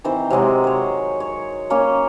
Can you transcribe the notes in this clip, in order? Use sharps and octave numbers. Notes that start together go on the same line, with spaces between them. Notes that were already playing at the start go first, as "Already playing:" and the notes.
D#3 E3 C4 C5
C3 F#3 G#3 C4
C5 C#5
C#5
A#3 C#4 C#5 G#5